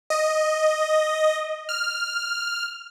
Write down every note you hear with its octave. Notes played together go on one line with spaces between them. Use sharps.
D#5
F6